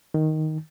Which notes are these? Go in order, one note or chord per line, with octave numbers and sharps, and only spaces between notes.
D#3